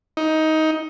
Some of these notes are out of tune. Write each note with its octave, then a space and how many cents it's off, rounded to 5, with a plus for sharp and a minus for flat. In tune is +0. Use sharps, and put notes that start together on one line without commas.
D#4 +15